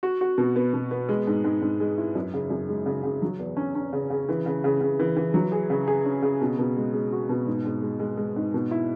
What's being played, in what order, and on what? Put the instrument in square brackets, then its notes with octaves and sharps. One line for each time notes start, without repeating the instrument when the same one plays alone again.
[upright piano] F#4
F#4
B2
B3
B2
B3
G#3
G#2
G#2
G#2
G#3
E4
F#2
C#3
F#2
G#3
C#3
C#3
F#3
E2
C#4
C#4
C#3
C#3
E3
C#3
C#3
C#3
E3
E3
F#3
G#4
C#3
G#4
C#4
C#3
B2
B2
G#3
G#3
F#4
B2
G#2
G#2
G#3
G#3
G#3
G#2
B2
E4